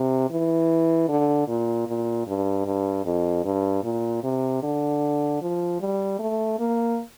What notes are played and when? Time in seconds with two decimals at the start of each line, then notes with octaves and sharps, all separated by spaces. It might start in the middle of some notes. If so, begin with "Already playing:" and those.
Already playing: C3
0.31 E3
1.08 D3
1.48 A#2
1.87 A#2
2.27 G2
2.66 G2
3.05 F2
3.44 G2
3.84 A#2
4.24 C3
4.63 D3
5.42 F3
5.81 G3
6.19 A3
6.60 A#3